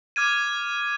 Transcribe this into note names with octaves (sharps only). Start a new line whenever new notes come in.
D6 F6 G#6 D#7